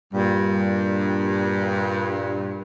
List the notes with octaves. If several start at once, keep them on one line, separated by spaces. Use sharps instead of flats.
G2 A#2 G3